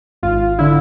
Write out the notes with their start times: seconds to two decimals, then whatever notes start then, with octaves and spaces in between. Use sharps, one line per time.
0.23 G#1 F4
0.59 D3 E4